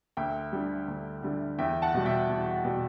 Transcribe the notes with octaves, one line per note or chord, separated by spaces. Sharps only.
D2 E5 G5
D3 G3
D2
D3 G3
E2 E5 G5
F#5 A5
B2 G3
E5 G5
E2
B2 G3